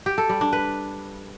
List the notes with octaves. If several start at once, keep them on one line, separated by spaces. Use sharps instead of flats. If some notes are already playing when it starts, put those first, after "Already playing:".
G4
A4
G3
D4
B4